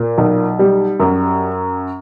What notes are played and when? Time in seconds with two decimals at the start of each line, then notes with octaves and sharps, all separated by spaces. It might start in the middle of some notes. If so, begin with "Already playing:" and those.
Already playing: A#2
0.18 B1
0.59 G3
1.00 F#2